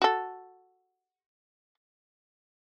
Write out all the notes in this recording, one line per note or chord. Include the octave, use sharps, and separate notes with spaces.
F#4 A4